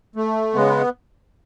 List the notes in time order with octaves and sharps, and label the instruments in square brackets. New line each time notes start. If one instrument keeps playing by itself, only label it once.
[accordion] A3
C#3 G#3 B3